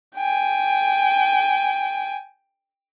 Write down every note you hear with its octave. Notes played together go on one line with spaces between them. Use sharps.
G5 G#5